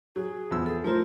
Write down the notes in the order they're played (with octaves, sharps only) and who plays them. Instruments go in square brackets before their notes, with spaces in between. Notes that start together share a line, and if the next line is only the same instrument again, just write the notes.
[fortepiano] F#3 [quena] G#4
[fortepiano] E2 F3 E6
[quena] G#4 [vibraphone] A4
[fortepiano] F3 C5 [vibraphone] A3 E4 F4 [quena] A#4